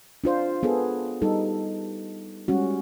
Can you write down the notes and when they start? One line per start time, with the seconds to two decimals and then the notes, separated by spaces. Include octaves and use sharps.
0.24 D4 F4 C5
0.63 B3 G#4 A4
1.22 G3 D#4 A4
2.48 G3 G#3 C#4 F#4